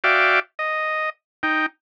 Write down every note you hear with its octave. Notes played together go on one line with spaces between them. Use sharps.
F#4 D5 E5 F5 G5 D6
D#5
D#4 G5